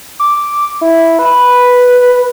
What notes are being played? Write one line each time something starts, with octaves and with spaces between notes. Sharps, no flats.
D6
E4
B4